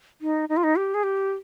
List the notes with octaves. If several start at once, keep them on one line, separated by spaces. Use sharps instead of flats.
D#4
D#4
F4
D#4
G4
G#4
G4